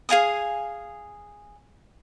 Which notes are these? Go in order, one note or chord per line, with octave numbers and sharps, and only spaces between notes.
G#4 F5 G#5 D#6